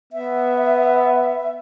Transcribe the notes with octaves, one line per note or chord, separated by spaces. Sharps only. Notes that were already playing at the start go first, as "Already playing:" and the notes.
B3 E5